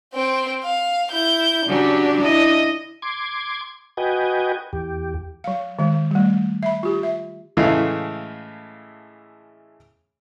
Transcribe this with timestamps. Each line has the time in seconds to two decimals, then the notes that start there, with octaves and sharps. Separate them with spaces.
0.14 C4 G5
0.64 F5
1.11 E4 G6
1.66 C#3 F#3 D4 G4
2.21 E4 D#5
3.02 C6 D6 G#6
3.97 F#4 B4 D#5 G5 G#5
4.73 E2 G4
5.44 F#3 F5
5.79 D#3 G#3
6.11 G3 A3
6.63 E5 B5
6.83 F4 G4
7.03 E5
7.57 A2 C#3 E3 G#3 A3 F5